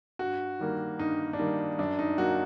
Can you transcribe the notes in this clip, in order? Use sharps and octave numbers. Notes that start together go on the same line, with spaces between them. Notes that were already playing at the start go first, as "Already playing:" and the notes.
G2 F#4
D#3 G3 A#3
G2 D#4
D4
D#3 G3 A#3 D#4
F#2 D4
D#4
F#3 A#3 F#4